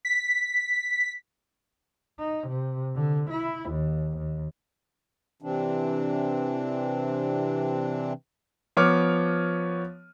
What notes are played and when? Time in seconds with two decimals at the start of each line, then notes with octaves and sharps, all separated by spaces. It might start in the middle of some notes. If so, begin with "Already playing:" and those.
0.05 B6
2.19 D#4
2.47 C3
2.95 D3
3.30 E4
3.70 D#2
4.17 D#2
5.42 C3 E3 C4 D4
8.77 F3 B3 C#5 D6 F6